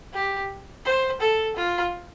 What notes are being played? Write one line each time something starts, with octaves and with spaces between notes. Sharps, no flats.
G4
C5
A4
F4